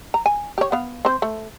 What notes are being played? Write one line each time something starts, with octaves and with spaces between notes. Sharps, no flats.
A#5
G#5
G4 C#5
B3 F5
C4 C5
A3